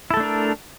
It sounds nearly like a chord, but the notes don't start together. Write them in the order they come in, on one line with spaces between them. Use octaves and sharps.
E4 A4 A3 D4 A#4